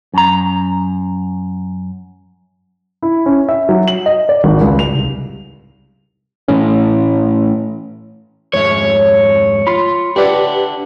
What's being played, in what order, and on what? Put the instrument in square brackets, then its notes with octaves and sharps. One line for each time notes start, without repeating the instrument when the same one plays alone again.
[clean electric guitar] F#2 A#5
[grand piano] E4
C#4
E5
F#3
F#7
D#5
D5
G#1
C#2
F7
C2
[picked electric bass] A2 E3 A3 C#4
[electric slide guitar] F2 G#2 E5 [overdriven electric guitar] C#5
[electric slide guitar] F4 [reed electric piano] B5 C6
[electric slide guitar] D4 E5 F#5 [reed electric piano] G4 B4 D5